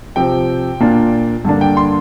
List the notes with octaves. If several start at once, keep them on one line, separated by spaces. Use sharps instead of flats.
C3 F3 C4 G5
A#2 A#3 D4 F4
G2 D3 A#3 D4
G5
C6